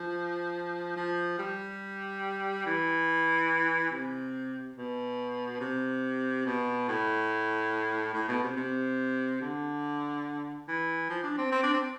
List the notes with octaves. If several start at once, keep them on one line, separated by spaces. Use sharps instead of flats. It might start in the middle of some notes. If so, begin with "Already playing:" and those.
Already playing: F3
F3
G3
E3
C3
B2
C3
B2
A2
A2
B2
C3
C3
D3
E3
F3
D4
C4
C4
D4
C4